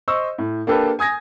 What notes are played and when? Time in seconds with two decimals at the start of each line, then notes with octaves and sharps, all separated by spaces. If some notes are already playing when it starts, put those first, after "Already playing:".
0.08 C5 D#5 C#6 E6
0.38 A2
0.67 A#3 D4 G4 A4 B4
0.99 G#5 D#6 G#6 A#6